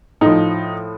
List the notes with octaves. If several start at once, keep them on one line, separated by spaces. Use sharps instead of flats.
A2 F3 D#4